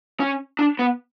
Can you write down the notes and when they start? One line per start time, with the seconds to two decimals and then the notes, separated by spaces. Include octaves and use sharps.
0.20 C#4
0.59 D4
0.79 B3